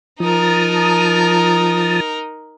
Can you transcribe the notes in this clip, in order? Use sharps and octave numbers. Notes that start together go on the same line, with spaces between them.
F3 D#4 A#4 A5 D#6